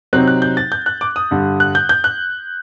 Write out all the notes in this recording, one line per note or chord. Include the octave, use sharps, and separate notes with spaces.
C3 F#3 C4 D#4 F#6
F#6
G6
A6
G6
F#6
D6
D#6
G2 D3 G3
F#6
G6
G6
F#6